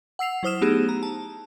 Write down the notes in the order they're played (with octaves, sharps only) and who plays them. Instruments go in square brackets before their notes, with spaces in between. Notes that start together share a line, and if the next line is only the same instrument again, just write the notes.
[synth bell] F#5 E6 C7 F7
F#3 E4 C5 D#6 F6 E7
A3 B3 D#4 G4 G#4
A#5
A5